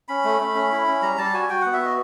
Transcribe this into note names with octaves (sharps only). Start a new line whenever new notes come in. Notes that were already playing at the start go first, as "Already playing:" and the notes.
C#4 B5
A3
A3
C#4
E4
C#4
G3 A#5
G3 A5
F#4 G#5
F#4 G5
B3 F#5
E5
F#4 D#5